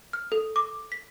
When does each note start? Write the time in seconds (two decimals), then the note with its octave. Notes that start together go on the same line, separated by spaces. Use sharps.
0.13 F6
0.32 A4
0.56 D6
0.92 B6